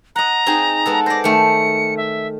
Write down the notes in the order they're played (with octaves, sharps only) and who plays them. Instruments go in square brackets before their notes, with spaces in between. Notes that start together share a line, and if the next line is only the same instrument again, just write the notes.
[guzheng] D#5 F#5 [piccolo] A#5
[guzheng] C4 D#4 G#4
G#3 B3 A4
[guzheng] C5 D5 [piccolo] A#6
[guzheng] D#3 A3 [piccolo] C#7
[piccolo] E5